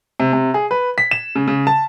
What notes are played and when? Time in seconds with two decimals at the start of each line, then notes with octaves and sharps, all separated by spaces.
0.20 C3
0.33 C3
0.54 G#4
0.71 B4
0.98 B6
1.11 E7
1.36 C#3
1.48 C#3
1.67 A5